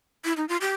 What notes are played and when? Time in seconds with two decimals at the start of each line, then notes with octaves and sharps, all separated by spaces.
0.25 E4
0.37 D#4
0.49 F4
0.61 G4